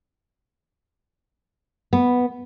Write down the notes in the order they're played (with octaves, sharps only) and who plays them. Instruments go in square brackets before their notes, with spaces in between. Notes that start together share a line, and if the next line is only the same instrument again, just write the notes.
[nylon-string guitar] B3